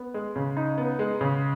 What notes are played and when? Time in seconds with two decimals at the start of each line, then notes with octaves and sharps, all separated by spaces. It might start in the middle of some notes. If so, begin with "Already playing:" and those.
Already playing: B3
0.14 G#3
0.36 C#3
0.57 D#4
0.78 B3
0.99 G#3
1.21 C#3